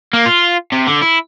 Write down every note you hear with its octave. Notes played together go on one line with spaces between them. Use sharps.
A#3
F4
C3
D3
E4